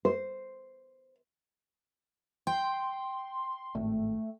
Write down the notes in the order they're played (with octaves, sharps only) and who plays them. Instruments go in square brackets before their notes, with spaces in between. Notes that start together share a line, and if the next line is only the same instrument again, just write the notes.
[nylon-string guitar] C5
[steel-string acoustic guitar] G5 [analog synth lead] C6
[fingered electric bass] G#1 A2 [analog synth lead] A3